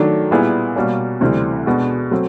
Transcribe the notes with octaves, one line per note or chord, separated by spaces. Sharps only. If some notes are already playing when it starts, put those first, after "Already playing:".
Already playing: D#3 F#3 A3 D4
A#2 G3 B3 E4 G#4
B2 G3 A#3 C#4
D2 C3 E3 G3 C4
B2 G#3 B3 D4 F#4
F#3 A3 C4